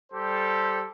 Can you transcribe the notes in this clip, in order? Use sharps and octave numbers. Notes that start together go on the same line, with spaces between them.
G3 G4 A4 C5